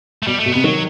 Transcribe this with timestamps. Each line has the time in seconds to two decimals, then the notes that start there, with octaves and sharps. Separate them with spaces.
0.23 A3
0.27 B2 G3
0.40 A3
0.46 B2
0.52 C3 B3
0.64 D#3 F#3